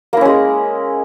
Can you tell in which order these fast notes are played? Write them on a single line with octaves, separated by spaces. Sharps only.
A#3 E4 C#4 G#3